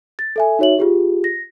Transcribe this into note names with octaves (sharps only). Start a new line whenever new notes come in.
A6
A4 E5 G#5
D#4 F#4 C#5 E5 F#7
F4 G4 G#4
A#6